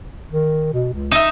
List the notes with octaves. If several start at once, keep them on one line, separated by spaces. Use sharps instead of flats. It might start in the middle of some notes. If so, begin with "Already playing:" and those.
D#3
B2
C#2
D#4 E5